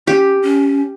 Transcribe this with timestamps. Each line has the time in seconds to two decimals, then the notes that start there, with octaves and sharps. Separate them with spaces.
0.07 C#4 G4
0.42 C#4